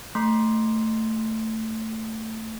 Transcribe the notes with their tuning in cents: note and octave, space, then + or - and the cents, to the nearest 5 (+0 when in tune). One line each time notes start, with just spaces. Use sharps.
A3 +15 C6 +0